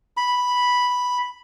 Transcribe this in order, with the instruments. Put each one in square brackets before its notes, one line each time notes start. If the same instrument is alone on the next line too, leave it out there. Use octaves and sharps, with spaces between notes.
[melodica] B5